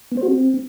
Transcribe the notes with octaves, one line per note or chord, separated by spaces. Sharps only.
B3
C5
F#4
C4